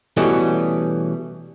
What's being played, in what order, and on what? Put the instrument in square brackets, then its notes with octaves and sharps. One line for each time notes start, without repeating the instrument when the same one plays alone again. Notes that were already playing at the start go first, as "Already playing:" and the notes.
[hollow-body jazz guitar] B2 E3 G3 A3 C#4